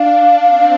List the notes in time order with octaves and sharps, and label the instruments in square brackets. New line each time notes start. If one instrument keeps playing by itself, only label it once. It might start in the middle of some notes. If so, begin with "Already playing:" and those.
Already playing: [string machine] D4 [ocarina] F5
[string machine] C4